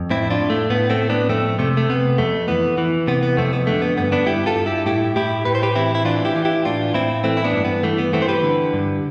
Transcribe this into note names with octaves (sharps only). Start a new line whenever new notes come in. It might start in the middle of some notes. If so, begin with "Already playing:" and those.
Already playing: F2
A2 C4 E4
D4 F4
A2
A3
A2 B3
A3 C4
A2
B3 D4
F2 A3 C4
C3 A3
A3
C3 B3
F2 A3
E3 B3
E3
C3 B3
B3
F2 A3 C4
B3
D3 A3
B3
G2 B3
B3 D4
G2 E4 G4
F4 A4
G2
E4 G4
A2 E4 G4
A2 E4 G4
A2 B4
C5
G4 B4
E3 C4 E4
E4
E3 D4 F4
E4 G4
E3
E4 G4
A2 D4 F4
A2 C4 E4
E3 A3 C4
E4
B3 D4
G2
B3
E3 A3
B3
E3 A3 C4
C5
G4 B4
D3
G2